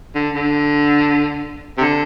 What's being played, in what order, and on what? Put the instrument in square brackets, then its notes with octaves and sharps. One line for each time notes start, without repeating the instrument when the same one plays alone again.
[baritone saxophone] D3
D3
C3
D3